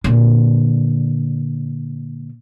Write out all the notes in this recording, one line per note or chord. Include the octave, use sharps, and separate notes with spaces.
A#2 D3